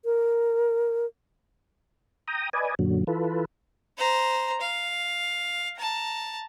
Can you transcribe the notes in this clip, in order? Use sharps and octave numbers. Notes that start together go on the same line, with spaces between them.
A#4
G5 A#5 D#6
B4 D5 D#5 G#5
F#2 A#2 D3 F#3
E3 F4 A4 B4
C5 A#5
F5
A5 A#5